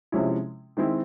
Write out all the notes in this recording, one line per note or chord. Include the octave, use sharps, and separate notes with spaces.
C3 F3 G#3 C#4 E4
D#3 G#3 C4 E4